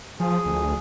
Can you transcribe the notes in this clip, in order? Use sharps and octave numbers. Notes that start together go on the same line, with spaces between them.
F3 G#4
D2